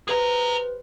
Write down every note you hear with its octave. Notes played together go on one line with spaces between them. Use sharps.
G4 G#4 B4 C5 A#5